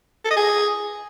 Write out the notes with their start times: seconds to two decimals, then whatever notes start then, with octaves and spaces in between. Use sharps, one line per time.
0.25 A4
0.31 D#5
0.37 G#4